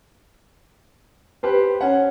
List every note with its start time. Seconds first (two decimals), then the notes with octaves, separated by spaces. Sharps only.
1.43 G4 B4 C5
1.81 C#4 F#5